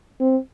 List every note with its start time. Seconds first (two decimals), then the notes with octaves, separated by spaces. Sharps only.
0.21 C4